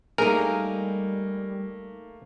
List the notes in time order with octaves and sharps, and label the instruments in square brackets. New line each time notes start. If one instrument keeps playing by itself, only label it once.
[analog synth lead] G3 [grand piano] A3 A#3 [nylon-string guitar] D#4 G#4 [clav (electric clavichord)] A#4